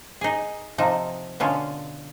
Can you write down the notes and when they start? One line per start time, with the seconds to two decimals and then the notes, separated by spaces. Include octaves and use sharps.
0.21 D#4 G#4
0.78 C3 F3 D#4
1.40 B2 D3 C#4 F4